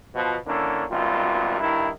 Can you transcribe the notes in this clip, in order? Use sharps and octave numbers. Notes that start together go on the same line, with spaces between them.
B2 F3
D3 A#3 C#4 D4 E4
G#1 F#2 B2 G3 F4
G2 D#3 E4